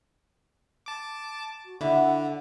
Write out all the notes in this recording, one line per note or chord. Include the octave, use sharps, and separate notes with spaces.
A5 D6
F#4
D3 E4 F#5 D6